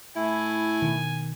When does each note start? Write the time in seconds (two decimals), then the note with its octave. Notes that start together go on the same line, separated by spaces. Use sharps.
0.16 A2 E4 G#5
0.82 B2 D#3